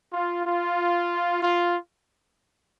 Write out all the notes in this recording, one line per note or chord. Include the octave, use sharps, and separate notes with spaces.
F4
F4
F4